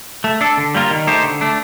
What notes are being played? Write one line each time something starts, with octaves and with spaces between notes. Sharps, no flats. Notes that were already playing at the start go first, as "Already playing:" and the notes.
A3
D4 A4
D3
G3 A#3 F4 A#4
D#3
A3 D#4 G4 C5
D3
A3 D4